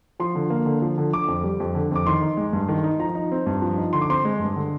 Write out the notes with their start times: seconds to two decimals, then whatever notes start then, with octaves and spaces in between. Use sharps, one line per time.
0.20 F3 C6
0.35 D3
0.50 A#3
0.66 D3
0.82 F3
0.98 D3
1.13 D3 D6
1.28 F2
1.44 G3
1.60 F2
1.75 D3
1.91 F2 D6
2.06 D#3 C6
2.22 D#4
2.37 G#3
2.53 G2
2.69 D#3
2.84 D#4
2.99 F3 A#5
3.15 D#4
3.32 C4
3.46 G2
3.62 F3
3.78 D#4
3.93 D3 C6
4.01 D6
4.10 C4 C6
4.25 G#3
4.40 G2
4.56 D3